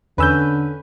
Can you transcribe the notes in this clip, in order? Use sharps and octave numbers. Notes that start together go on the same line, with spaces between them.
E2 D3 C#4 B4 E6 G6